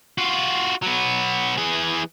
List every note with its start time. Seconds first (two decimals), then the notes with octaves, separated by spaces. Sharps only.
0.18 F4 F#4
0.83 F#3 B3
1.58 E3 G#4